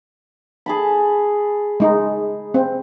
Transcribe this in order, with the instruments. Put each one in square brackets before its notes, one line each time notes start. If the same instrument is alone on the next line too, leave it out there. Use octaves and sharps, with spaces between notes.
[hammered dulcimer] G#4 A5 B5
[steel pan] G#3 D#4
C4